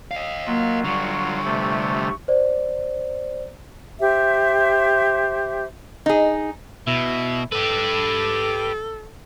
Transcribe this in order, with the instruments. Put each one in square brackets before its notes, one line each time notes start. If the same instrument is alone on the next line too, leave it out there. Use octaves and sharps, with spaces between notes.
[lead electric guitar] D#5 F5
[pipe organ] F#3 F4 [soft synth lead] A#3
[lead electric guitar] D3 G3 [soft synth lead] C#6
[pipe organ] C3 A3
[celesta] C5 D5
[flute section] G4 C5 E5
[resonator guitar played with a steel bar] D#4 G#4
[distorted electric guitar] B2 [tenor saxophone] E4
[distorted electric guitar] G4 B4 [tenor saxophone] A4